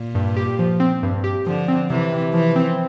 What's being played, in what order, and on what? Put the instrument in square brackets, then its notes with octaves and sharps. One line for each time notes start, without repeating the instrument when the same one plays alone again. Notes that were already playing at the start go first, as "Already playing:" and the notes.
Already playing: [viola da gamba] A#2
[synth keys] G2
G4
F3
C4
G2
G4
[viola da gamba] D3 [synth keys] F3
[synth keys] C4
[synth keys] C3 [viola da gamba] E3
[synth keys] C3
[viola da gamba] E3 [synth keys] F3
[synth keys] C4